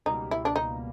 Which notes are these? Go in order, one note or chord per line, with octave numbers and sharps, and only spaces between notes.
C#2 B2 G3 A#3 D#4
E4
D4
D#4